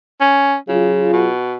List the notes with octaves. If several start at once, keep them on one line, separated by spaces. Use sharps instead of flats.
C#4
C#3 F#3 F4 G#4
B2